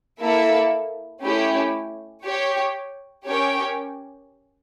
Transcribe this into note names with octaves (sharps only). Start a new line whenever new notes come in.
A#3 E4 A4 E5
A3 C#4 E4 G4
G4 C#5 G5
C#4 G4 A#4 C#5 G5